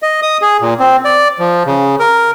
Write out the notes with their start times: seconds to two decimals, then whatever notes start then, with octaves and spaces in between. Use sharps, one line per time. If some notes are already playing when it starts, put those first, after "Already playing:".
0.03 D#5
0.22 D#6
0.42 G#4
0.61 A#2
0.80 C4
1.05 D5
1.39 F3
1.66 C#3
2.00 A#4